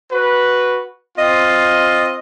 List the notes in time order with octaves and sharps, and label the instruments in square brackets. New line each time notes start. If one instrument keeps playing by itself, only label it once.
[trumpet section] F#4 B4
[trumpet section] C4 F4 [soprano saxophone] D#5